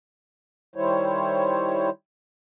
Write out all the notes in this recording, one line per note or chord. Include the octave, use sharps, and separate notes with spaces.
D#3 G3 E4 C5 C#5